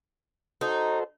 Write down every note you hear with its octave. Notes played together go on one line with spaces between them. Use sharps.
D#4 F#4 A4 C5